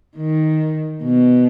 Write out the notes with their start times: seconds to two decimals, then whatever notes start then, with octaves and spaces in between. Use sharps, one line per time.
0.17 D#3
1.03 B2